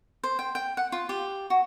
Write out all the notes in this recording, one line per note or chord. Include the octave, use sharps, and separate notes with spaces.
C5
G5
G5
F#5
F4
G4
F#4